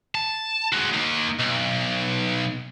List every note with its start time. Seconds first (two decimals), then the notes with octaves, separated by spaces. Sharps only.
0.15 A5
0.72 G#3 F#4
0.94 A#3 D#4
1.40 B1